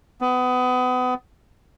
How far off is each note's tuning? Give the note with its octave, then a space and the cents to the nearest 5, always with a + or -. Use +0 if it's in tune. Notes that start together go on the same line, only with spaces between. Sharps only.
B3 +30